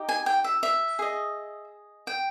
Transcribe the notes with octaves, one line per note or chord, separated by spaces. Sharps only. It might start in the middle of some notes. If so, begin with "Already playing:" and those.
Already playing: D#4 G4 D#5
G#5
G5
E5
E5
G#4 D#5
G5